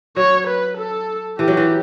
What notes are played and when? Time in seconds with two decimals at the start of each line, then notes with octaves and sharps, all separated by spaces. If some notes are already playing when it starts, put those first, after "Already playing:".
0.16 F#3 C#5
0.47 B4
0.78 A4
1.38 E3 G4
1.48 F#3
1.57 E3